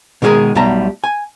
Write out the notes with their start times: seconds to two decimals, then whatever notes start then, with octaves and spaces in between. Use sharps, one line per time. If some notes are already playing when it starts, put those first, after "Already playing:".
0.22 B2 D#3 G#3 C4 G#4 A#4
0.55 B1 B2 G3 A3 A5 A#5
1.04 G#5